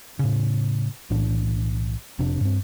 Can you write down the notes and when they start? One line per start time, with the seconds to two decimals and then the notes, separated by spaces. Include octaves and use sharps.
0.19 A2 C#3
1.10 B1 A2 E3 D4
2.19 F1 C3 D4
2.41 G2 C4